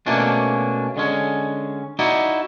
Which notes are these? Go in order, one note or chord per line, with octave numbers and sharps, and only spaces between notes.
B2 A3 A#3 C#4 D4
D3 G#3 C#4
D#4 E4 F#4 D5